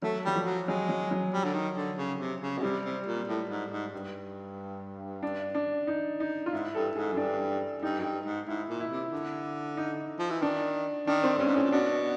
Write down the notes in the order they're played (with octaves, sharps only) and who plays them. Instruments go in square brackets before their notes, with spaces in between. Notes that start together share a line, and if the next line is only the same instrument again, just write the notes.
[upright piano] F#3 [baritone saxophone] A3
[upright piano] F#3 [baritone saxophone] G3
[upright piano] F3
[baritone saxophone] F#3
[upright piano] F#3 [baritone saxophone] G#3
[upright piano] F#3
F#3
[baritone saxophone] G3
D3
D#3
D3
C#3
C3
C#3
B2
[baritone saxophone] C3 [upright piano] G3
[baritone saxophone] C3
A#2
A2
G#2
G#2
G2
[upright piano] D4
D4
D#4
D#4
F4
[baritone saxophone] G#2 [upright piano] E4
[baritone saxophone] G2 [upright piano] A4
[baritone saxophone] G#2 [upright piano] G#4
[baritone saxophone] F#2
[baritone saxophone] G2 [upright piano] D4
[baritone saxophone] G2 [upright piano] D#4
[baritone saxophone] F#2
G2
G#2
[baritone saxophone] G#2 [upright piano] E4
[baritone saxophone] A#2
[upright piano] E4
[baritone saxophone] C3
D3
[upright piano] D#4
[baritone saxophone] F3
E3
[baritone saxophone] D#3 [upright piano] D4
[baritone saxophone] D#3 [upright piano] D4
[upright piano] C4
[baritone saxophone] G2 [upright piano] C#4
[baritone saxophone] G#2
[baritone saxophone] A2 [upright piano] C#4
[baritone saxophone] A#2
[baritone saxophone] B2 [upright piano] D4